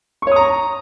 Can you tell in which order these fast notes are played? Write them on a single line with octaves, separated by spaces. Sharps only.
C#6 C#5 D#6 A#5